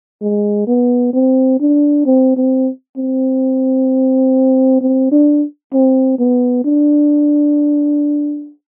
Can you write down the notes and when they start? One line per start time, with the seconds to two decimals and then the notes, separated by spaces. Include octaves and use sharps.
0.22 G#3
0.67 B3
1.13 C4
1.60 D4
2.06 C4
2.37 C4
2.97 C4
4.81 C4
5.12 D4
5.74 C4
6.19 B3
6.65 D4